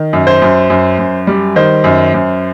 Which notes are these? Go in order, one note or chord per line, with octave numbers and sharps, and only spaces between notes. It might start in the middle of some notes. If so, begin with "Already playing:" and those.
Already playing: D#3
F#2
C5
F#2
F#2
F#2
G3
D#3 C5
F#2
F#2